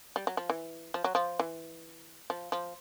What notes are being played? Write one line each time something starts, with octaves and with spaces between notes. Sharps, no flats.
G3
F#3
F3
E3
F3
F#3
F3
E3
F3
F3